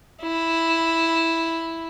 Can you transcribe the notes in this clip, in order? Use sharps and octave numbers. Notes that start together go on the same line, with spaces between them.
E4